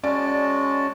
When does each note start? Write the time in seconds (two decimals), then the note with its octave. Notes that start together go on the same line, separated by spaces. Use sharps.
0.04 G#3 C#4 F#4 D5 A5